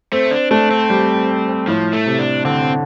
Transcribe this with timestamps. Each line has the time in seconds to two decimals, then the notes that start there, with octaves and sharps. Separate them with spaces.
0.12 A3 C4
0.31 D4
0.51 A3 D4
0.71 C4
0.90 G3
1.67 A2 F3
1.93 A3
2.06 C3
2.19 D4
2.45 D3 C4